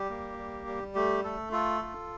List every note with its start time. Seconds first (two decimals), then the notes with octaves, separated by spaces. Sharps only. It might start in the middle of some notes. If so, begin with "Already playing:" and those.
Already playing: G3 G4
0.09 A#3
0.38 G3
0.67 G3
0.95 A3 G4
1.24 A3 A4
1.52 F4 A4
1.82 F4